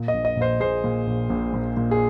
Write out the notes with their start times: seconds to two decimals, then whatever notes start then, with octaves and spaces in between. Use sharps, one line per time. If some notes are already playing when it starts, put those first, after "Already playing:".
Already playing: A#2
0.08 D#5
0.14 A#1
0.25 D#5
0.37 A#1 C5 D#5
0.60 A#2 G#4 C5
0.84 A#2
1.07 A#1
1.30 A#1
1.54 A#2
1.77 A#2
1.91 G#4